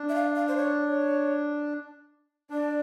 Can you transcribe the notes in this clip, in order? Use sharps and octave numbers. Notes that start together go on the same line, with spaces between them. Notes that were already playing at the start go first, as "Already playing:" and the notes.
Already playing: D4
E5
F5
F5
C5
C#5
C#5
D4 D5